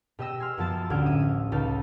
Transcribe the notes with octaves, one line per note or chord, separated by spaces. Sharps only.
B2 G4 D#5 G5 E6 A#6
G#5 C6 F6
F#2 F3 B3 A5 E6 A6
A1 D2 F6 G#6 D7
E5 D#6
C#2 D#4 F5 A5